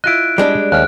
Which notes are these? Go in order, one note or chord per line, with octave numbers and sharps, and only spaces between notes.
E4 F4 D#5 F#6 D7
G3 G#3 D4
D#2 F6 F#6